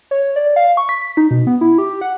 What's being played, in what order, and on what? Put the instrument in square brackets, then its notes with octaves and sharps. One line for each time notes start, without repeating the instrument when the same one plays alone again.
[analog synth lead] C#5
D5
F5
C#6
B6
D#4
B2
B3
E4
G4
F#5